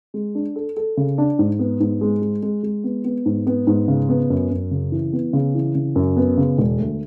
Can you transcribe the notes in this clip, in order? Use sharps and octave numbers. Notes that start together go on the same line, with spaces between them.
G#3
D4
A4
A4
C#3
D4
G#2
B3
G#2
G#3
G#3
G#3
G#3
B3
B3
G#2
B3
G#2
C#3
B3
F#2
F#2
C#3
E3
B3
C#3
E3
C#3
F#2
B3
C#3
E1
D2